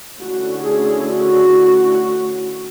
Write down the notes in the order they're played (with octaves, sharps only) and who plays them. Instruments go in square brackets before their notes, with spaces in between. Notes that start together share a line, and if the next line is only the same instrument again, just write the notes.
[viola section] D3 A3 C#4 E4 F#4
G#4
F#4